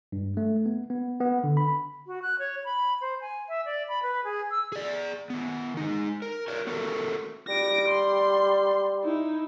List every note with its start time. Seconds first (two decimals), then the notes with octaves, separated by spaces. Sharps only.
0.12 G2
0.37 A3
0.66 B3
0.90 B3
1.21 B3
1.44 D3
1.57 B5
2.07 F#4
2.22 F#6
2.39 C#5
2.65 B5
3.01 C5
3.21 G#5
3.49 E5
3.65 D5
3.89 B5
4.03 B4
4.24 G#4
4.51 E6
4.72 G#4 D5
5.30 D#3 B3
5.77 G#3 D#4
6.22 A#4
6.48 A#4 C#5 D5
6.67 B3 F#4 A4 A#4
7.48 G3 A#6 D7
7.89 C6
9.04 D#4 E4